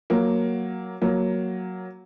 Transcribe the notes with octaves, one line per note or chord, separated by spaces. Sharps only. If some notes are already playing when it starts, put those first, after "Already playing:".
F#3 A#3
F#3 A#3